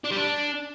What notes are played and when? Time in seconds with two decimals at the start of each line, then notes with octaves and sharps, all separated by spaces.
0.04 D4
0.11 G3
0.17 D4